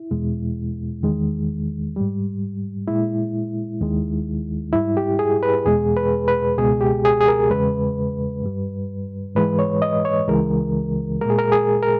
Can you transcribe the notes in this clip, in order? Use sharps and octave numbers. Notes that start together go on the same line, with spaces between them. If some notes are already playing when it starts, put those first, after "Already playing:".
Already playing: E4
E2 B2 G#3
E2 D#3 G#3
G#2 G3
A#2 G#3 E4
D#2 D#3 G#3
G#2 G3 E4
G4
G#4
B4
E2 B2 G#3 G#4
B4
B4
C#2 B2 G#3 G#4
G4
G#4
G#4
A#4
E2 C#3 G#3 B4
G2 G3
G#2 E3 G#3 B4
C#5
D#5
C#5
C#2 C#3 E3 G#3 A#4
A#2 G#3 G#4 A#4
A#4
G#4
A#4